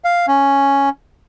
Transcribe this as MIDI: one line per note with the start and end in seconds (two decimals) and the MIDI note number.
0.04 0.26 77
0.28 0.89 61